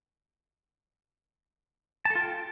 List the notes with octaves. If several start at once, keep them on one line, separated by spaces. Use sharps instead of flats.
F4 A4 G5 A5